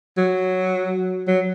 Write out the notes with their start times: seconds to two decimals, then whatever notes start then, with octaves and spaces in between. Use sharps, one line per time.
0.18 F#3
1.28 F#3